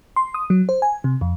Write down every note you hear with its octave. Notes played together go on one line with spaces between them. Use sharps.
C6
D#6
F#3
C5
G#5
C3
F2